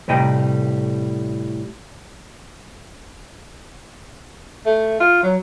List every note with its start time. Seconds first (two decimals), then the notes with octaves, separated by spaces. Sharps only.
0.08 A2 C3 G3 D#5 G5 A#5
4.66 A3
5.00 F4
5.23 F#3